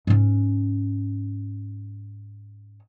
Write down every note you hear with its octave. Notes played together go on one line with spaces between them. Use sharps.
G#2 C#4